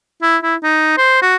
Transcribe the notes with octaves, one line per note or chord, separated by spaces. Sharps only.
E4
E4
D#4
C5
F#4